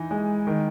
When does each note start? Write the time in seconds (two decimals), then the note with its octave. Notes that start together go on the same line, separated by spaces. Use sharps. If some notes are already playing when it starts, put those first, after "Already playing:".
Already playing: E3 D#4
0.11 G#3
0.47 D#3